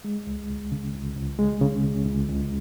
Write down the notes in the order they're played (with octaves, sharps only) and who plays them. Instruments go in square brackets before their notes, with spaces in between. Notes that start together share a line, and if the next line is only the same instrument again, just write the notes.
[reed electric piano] G#3
C#2
C#2
C#3
C#2
C#2
G#3
C#3
C#2
C#2
C#2